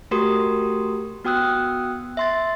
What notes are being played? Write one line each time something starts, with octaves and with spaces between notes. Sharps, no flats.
A3 F#4 G4 A#4 C6 D#6
B3 F#4 G5 D#6 E6 F#6
E5 C6 A6